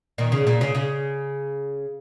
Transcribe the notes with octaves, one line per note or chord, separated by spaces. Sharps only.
A#2 D#3
C#3
A#2
C#3
C#3